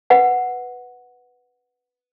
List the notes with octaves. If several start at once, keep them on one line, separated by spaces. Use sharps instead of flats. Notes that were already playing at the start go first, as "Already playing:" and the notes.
B4 F#5